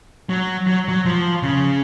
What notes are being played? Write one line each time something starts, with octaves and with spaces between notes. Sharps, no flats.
F#3
F#3
F#3
F3
C#3